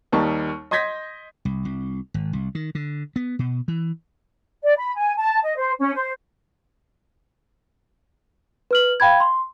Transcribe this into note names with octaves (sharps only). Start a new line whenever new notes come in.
D#2 G3 D#4 A#4 A5 C#6
D#5 C6 G6 G#6 A#6 B6
C2
C2
G#1
C2
D#3
D3
B3
B2
E3
D5
B5
G#5
A5
D#5
C5
C#4
C5
B4 F6 F#7
F5 G5 B5 G#6
C6